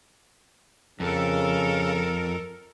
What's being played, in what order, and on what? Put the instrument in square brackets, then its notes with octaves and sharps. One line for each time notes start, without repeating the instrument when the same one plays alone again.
[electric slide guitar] F2 [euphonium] C#3 [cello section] A4 A#4